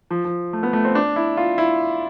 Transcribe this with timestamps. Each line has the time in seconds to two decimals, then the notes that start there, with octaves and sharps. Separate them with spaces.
0.11 F3
0.25 F3
0.53 A3
0.63 B3
0.73 A3
0.85 C4
0.95 D4
1.16 E4
1.37 F4
1.58 E4